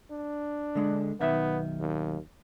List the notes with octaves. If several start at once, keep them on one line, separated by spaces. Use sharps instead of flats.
D4
D3 G#3
B1 D#3 B3 E5
D#2